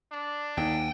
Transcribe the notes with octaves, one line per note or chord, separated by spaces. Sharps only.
D4
D#2 D#4 F#5 G5